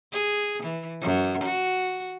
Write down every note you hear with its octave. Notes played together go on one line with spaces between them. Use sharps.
G#4
E3
F#2
F#4